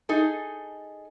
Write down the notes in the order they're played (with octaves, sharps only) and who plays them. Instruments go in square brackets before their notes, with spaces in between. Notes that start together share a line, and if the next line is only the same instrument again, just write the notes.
[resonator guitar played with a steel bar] D#4 G#4 A4